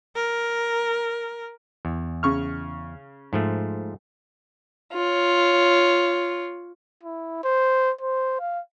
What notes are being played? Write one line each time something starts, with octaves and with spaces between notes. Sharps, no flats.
A#4
E2
C#3 C#6 F6
G#2 F3 A3
F4 C#5
E4
C5
C5
F5